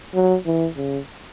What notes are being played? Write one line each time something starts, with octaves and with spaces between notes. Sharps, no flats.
F#3
E3
C#3